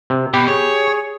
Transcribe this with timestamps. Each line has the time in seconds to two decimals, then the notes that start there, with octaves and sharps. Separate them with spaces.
0.10 C3
0.34 B2 G4 B5
0.48 G#4 C#5